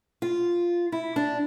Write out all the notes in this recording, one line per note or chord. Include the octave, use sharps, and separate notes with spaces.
F4
E4
D4